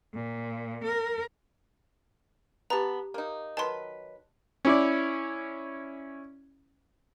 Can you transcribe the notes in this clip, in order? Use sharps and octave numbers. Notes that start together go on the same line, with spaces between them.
A#2
A#4
B3 G4 A5 A#5
A#3 D#4
D#3 F#3 B4 A5 C6
C#4 E4 D5